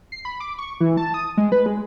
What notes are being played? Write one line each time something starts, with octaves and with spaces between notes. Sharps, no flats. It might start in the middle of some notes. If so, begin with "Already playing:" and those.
C7
B5
D6
C#6
E3
A5
D#6
G#3
B4
G#3